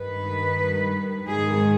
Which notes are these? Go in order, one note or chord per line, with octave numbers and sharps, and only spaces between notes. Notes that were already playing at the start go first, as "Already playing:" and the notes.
Already playing: G2 D#3 B4
G#2 D#3 G#4